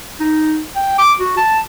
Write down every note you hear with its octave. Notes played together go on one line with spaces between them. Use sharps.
D#4
G5
D6
F#4
A5